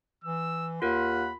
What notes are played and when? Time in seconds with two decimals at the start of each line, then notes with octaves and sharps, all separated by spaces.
0.24 E3 E6
0.82 D#2 F4 A#4 F#5 B5